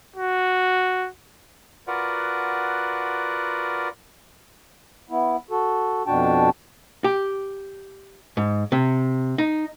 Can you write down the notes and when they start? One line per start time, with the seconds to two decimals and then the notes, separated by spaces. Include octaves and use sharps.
0.17 F#4
1.87 F4 F#4 A#4 B4 D5 F#5
5.10 B3 E4
5.50 F#4 A4
6.07 F2 B2 D4 F#4 G5 A5
7.04 G4
8.37 G#2
8.72 C3
9.38 D#4